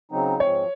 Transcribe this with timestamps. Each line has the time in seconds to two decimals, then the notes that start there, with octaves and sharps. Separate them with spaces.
0.11 C#3 F#3 C4 D#4
0.39 G#2 F3 G#3 C4 C#5